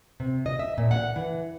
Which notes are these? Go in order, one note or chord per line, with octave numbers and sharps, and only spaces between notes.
C3
D#5
E5
A#2
F#5
E3